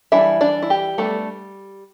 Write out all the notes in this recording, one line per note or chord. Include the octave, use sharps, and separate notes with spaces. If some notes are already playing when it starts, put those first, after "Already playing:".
E3 G3 D4 E4 E5
D4 D5
E4
G4
G3 A3 B3 D4 A4